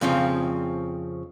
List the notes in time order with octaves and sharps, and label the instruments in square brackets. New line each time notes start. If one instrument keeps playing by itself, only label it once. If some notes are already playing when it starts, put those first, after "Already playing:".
[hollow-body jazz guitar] F2 C#3 F3 C4